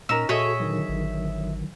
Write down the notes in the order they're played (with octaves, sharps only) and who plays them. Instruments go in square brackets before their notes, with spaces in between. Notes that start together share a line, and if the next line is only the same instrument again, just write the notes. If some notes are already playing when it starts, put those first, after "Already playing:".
[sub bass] A#2 [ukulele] C#4 D#4 A#4 [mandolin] E6
[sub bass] A#2 [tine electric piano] F#4 A4 [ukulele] G#4 [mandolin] C#5 D#5 E5
[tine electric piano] D3 D#3 F#3
[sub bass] G#1